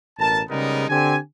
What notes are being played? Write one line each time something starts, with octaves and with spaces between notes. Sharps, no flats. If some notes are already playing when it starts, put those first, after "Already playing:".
A1 B2 A#4 A5
C#3 G3 G#3 B3 D#4 A#4
D3 C4 G4 G#5